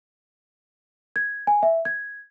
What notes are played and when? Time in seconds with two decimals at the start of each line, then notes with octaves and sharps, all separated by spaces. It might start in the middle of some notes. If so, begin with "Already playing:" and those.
1.16 G#6
1.47 G#5
1.63 E5
1.85 G#6